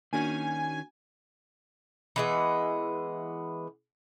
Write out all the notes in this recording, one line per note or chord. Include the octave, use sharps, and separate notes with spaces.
D#3 A#3 C#4 D4 F#4 G#5
E3 G#3 B3